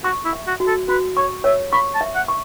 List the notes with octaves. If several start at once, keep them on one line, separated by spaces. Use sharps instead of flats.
F#4 C#6
E4
E5
F#4
F#4
A4
F#4 B4
C#5 C#6
C#5 E5
B5 C#6
A5
E5
F#5
C#6